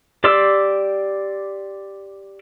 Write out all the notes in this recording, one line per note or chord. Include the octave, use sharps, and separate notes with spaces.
G4 D5 C6 D6 E6